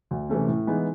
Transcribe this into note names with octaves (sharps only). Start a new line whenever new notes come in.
D2
C3 E3 A3 C#4
A2
E3 G#3 B3 D#4